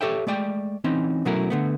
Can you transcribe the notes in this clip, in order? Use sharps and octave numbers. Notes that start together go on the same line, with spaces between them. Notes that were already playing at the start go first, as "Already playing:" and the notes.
G4 A4 C#5 E5 G5
G#3 A3 D5 G5
E3 C4 C#4 D#4
B2 F#3 A3 C#4 E4 A#4
D3 A3 B3